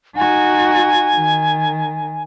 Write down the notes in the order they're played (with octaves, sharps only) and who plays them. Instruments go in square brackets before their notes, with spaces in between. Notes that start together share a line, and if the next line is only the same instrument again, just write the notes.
[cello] D#4 F#4 [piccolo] G#5
[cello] D#3